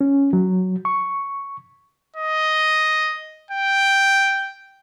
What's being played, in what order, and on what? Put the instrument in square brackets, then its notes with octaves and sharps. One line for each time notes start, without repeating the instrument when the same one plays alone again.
[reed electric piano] C#4
F#3
C#6
[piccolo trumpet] D#5
G5